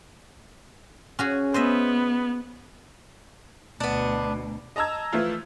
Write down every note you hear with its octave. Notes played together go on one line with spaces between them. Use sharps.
C#4 F#4 G#4
B3 C5 D#5 E5
D2 B2 B3 D4
D#5 A5 A#5 E6 G#6
E3 F3 A3 E4 F4